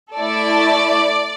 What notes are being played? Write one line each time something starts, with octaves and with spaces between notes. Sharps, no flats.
A3 E4 A4 D5